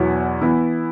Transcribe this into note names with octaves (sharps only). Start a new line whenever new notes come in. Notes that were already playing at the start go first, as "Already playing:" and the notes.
Already playing: E2 B2 F#3 B3 E4
E3 B3 E4